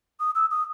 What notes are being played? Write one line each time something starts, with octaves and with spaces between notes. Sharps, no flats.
D#6
E6
D#6